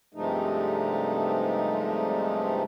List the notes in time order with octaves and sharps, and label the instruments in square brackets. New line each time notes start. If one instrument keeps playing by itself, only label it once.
[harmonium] G2 C3 F3 G#3 A3 D#4